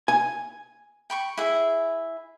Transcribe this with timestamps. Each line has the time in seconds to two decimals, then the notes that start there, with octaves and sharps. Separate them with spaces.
0.08 G#5
1.10 G5 B5 C#6
1.37 E4 G#4 E5